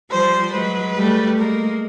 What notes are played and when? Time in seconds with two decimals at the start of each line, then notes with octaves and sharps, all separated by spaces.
0.10 F3 G3 C5
0.53 F#3 G#3 B4
0.96 G3 A3
1.38 G#3 A#3 A#4